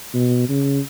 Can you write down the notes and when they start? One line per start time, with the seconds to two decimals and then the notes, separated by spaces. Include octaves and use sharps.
0.14 B2
0.49 C#3